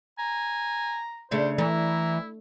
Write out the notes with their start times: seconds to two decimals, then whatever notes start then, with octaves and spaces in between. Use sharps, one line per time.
0.19 G#5 A#5
1.31 C#3 A3 D4 C5
1.58 E3 A3 E4 A#5